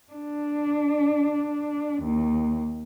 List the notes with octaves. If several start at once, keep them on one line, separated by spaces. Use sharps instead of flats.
D4
D#2